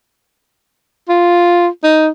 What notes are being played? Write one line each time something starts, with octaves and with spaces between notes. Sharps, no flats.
F4
D#4